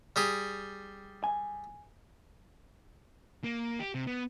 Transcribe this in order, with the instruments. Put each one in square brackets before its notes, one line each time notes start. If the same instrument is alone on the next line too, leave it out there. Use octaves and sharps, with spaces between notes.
[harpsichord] G3 G4 G#4
[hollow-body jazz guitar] G#5
[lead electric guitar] A#3
G4
C3
B3